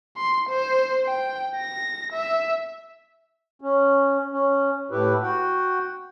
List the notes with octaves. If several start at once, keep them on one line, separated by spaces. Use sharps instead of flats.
C6
C5
G5
A#6
E5
C#4
C#4
A2 E4 G4 B4
F#4 F#5 G5